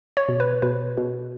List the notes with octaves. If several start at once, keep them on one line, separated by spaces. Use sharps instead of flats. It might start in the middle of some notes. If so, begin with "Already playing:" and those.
C#5
B2
B4
B2 B4
B2